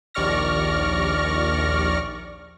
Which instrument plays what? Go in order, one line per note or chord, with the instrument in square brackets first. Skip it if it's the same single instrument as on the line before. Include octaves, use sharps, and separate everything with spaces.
[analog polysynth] A#1 D#2 D5 C#6 F6 A#6